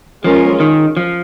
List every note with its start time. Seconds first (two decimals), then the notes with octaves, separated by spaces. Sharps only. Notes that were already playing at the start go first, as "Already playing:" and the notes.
0.24 F3 G#3 C#4 F4 A#4
0.60 D#3
0.97 F3